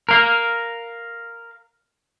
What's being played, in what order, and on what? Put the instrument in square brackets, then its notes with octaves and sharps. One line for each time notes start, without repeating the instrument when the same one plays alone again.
[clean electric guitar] A#4 F5